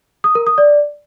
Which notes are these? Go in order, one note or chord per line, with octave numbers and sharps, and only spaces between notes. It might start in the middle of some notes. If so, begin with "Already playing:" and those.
D#6
A#4
D#6
D5